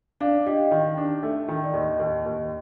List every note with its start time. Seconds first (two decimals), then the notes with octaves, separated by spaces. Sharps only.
0.20 D4 D5 F5
0.46 G4 D#5 G5
0.71 D#3
0.97 D4
1.23 A3
1.48 D#3
1.64 D5
1.73 D#2 D#5
1.99 D#2
2.26 D#2